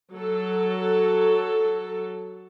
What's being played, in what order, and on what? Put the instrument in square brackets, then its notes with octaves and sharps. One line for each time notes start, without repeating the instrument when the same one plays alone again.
[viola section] F#3 A4